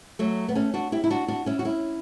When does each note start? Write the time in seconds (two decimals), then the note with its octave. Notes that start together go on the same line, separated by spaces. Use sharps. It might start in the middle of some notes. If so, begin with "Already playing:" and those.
0.19 F#3 A3
0.49 B3
0.55 A3 C#4
0.74 D4 F#4
0.92 E4 G4
1.04 E4
1.10 D4 F#4
1.28 D4 F#4
1.46 C#4 E4
1.59 F#4
1.65 C#4 E4